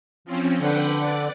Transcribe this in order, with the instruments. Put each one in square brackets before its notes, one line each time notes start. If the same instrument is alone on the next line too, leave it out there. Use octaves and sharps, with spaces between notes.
[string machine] F3 C4 C#4
[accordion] D3 [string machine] B4 F#5 G5
[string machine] D5